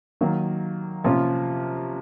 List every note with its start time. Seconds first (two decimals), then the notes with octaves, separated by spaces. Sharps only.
0.21 D#3 F#3 A#3
1.04 C3 F3 A#3 C#4 F4